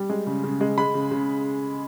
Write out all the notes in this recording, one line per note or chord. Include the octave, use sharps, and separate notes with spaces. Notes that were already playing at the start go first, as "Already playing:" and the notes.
Already playing: G3
G#3
C#3
C#3
G#3
G#3 B5
C#3
C#3